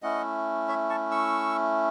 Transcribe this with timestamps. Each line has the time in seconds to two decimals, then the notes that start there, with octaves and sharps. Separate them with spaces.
0.02 A3 C#4 E4 D#5 F#5
0.68 C#5 E5
0.89 A5 C#6
1.11 C#6 E6